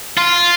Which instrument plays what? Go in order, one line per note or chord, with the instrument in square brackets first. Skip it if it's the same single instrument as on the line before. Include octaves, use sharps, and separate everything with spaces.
[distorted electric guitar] F4